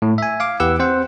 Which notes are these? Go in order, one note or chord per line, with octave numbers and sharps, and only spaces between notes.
A2
E5 G#5
F5 D6
E2 E3 G4 B4 F#5 E6
C4 C5 F#5